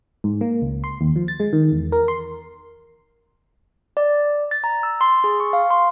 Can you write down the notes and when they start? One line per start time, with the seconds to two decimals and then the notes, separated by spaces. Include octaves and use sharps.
0.24 G#2
0.41 A#3
0.62 C#2
0.84 C6
1.01 D#2
1.16 F3
1.28 A6
1.40 G#3
1.53 D#3
1.72 E2
1.92 A#4
2.08 C6
3.97 D5
4.51 A6
4.64 A#5
4.83 E6
5.01 C6
5.24 G#4
5.40 C#6
5.53 F5
5.70 C6